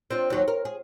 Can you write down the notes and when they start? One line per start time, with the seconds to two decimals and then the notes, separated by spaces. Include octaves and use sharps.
0.11 C4 D4 F4
0.30 D#2 F#3
0.48 A#4
0.65 G#4